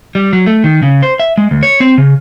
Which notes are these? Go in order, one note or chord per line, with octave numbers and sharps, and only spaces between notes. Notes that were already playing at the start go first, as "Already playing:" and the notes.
G3
F#3
A3
D#3
C#3
C5
E5
G#3
D2
C#5
C4
C#3